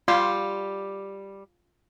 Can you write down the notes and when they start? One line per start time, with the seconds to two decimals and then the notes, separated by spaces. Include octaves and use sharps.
0.08 G3 F4 G4 C6